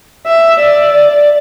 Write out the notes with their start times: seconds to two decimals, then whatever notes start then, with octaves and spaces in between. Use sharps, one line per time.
0.27 E5
0.60 D5